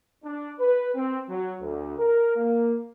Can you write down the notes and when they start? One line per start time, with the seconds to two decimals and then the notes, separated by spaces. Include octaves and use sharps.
0.24 D4
0.59 B4
0.95 C4
1.29 F#3
1.61 D2
1.98 A#4
2.37 A#3